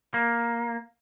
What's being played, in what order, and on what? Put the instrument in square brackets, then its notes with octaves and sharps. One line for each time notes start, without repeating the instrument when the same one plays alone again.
[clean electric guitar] A#3